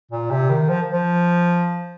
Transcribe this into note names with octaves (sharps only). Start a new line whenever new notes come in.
A#2
C3
D#3
F3
F3